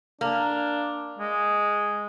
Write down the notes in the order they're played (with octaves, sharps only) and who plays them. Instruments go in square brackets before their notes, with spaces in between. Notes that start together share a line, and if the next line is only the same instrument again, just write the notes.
[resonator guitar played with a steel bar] A#3 [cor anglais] D4
[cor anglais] G#3